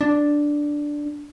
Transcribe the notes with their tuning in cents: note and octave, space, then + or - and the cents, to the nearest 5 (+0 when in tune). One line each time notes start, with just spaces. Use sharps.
D4 +0